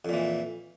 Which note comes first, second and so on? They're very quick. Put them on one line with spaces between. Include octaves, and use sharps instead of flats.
F2 A#2 E3